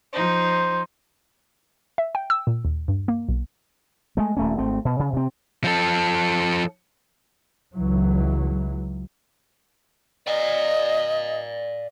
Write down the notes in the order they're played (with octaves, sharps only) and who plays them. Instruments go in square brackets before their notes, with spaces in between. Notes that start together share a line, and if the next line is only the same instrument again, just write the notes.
[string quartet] F3 D#4 [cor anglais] C5
[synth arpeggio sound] E5
G5
E6
A#2
D#2
G2
A#3
B1
[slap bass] G#3 A3
D#1 A3 A#3 C#4
G#1 A3 C4
B2
C#3
C3 C4
[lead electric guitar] F3 A4
[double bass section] C#2 E3 F#3
[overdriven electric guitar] D5 F5 [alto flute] D#5